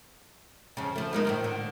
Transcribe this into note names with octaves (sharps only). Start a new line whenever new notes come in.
F2 C#3
F3 A3
G#3 A#3 D#4
A2 D#3 F3
D3